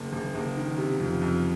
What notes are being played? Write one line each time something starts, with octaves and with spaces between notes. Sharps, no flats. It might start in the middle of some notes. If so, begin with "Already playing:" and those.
Already playing: F#1
F#1
F#1
D#3
C3
F2
F2